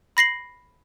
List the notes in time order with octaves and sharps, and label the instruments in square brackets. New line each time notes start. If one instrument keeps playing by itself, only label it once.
[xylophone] B5 A#6 C7 F#7